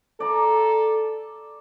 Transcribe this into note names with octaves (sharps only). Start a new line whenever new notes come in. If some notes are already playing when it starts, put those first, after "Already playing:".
A4 D5 A#5